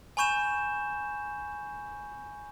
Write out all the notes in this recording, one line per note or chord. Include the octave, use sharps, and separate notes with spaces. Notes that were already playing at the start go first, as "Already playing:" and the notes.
G#5 B5 C#6 G6 E7